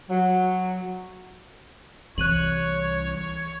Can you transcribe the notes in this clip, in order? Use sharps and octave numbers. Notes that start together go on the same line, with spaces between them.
F#3
C2 E3 C#5 F#6 D#7 F#7